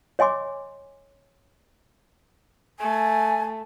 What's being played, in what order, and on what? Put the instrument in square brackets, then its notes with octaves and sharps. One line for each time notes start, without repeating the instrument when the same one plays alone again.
[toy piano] C#5 D#5 G#5 C6 D6
[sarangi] A3 [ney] G#5